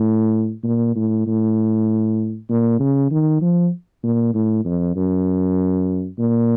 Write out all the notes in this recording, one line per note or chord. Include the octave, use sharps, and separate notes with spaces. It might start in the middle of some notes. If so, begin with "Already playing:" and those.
Already playing: A2
A#2
A2
A2
A#2
C#3
D#3
F3
A#2
A2
F2
F#2
A#2